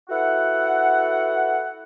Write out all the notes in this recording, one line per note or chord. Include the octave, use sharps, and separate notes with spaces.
E4 F#4 A4 B4 F#5